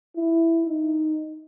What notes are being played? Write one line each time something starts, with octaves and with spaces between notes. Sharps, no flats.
E4
D#4